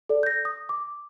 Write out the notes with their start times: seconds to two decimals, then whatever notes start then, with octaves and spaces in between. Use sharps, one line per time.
0.09 A4 D5
0.23 G6 A#6
0.45 D#6
0.69 D6